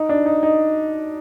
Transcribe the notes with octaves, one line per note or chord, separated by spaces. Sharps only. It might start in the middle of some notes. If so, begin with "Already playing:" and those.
Already playing: D#4
D4
D#4
D#4